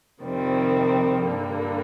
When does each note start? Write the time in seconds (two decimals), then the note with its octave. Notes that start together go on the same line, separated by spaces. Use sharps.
0.22 F2 C3 D#3 G3 C4
1.23 G2 D3 G3 A#3